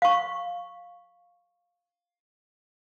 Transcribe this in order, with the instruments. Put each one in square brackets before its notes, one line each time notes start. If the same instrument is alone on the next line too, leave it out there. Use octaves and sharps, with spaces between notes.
[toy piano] F5 C#6